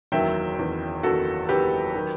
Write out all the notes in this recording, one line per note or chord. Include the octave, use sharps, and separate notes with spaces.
F#1 E2 D#3 F#3 E5 G5
F#1 E2 D#3 F#3
F#1 E2 D#3 F#3 F#4 A4
F#1 E2 D#3 F#3 G4 B4
D#3 F#3